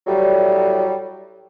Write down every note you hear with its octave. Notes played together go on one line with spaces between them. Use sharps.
A2 F#3 G3